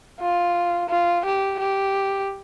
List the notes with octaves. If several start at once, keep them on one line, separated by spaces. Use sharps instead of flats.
F4
F4
G4
G4